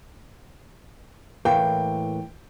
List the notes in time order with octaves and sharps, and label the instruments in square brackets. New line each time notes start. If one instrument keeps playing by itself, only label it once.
[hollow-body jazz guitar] A2 E3 A#3 [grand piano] G5